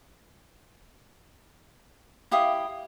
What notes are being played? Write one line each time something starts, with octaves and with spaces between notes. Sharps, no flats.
E4 G4 F5 D#6